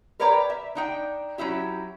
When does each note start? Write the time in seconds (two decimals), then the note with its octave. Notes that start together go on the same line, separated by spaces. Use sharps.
0.20 A#4 B4 C#5 D5 G5 A#5
0.50 E5
0.75 D4 D#4 G5
1.38 F#3 C#4 E4 G4